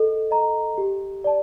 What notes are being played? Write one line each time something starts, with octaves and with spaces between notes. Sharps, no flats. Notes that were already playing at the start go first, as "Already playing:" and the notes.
Already playing: A4 D#5
D#5 A#5
G4
D5 A5